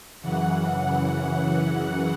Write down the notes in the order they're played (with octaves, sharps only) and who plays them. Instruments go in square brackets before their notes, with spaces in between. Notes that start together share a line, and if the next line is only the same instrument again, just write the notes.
[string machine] F#2 C#3 E3 F#5